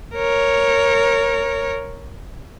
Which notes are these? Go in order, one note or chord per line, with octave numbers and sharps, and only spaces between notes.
A#4 C#5